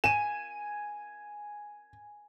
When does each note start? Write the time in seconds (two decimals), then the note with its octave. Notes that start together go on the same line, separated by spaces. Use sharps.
0.04 G#5 D#7 E7